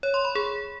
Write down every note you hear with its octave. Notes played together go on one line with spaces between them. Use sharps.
C#5
C6
B5
G#4